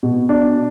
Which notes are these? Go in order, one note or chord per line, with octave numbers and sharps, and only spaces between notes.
B2
D4